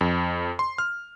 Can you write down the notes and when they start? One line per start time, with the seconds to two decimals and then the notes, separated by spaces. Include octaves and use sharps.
0.01 F2
0.59 C6
0.78 F6